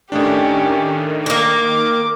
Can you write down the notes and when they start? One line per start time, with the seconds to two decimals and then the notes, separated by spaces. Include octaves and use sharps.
0.12 A2 D#3 A3 C#4 D4 G4
1.26 A#3 A#4 D6